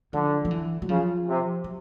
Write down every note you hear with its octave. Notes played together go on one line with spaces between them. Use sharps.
D3 F3
F3
E3
F#3
C#3 F3
C3
F#3